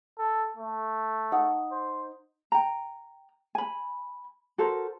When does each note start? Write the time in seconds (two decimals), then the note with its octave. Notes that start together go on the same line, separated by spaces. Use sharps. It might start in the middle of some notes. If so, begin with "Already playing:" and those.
0.19 A4
0.57 A3
1.32 D#4 F#5
1.72 C5
2.52 G5 A#5
3.55 G#5 B5
4.58 F#4 A4 A#4 C5